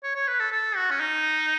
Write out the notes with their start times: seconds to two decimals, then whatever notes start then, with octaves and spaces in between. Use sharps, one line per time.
0.04 C#5
0.15 C#5
0.28 B4
0.40 A4
0.52 A4
0.76 F#4
0.91 C#4
1.00 D#4